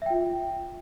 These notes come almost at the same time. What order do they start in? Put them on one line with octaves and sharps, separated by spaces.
E5 G5 F4